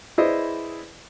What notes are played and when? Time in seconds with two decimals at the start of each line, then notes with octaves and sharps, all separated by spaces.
0.18 E4 G#4 B4 C5 D5 D#5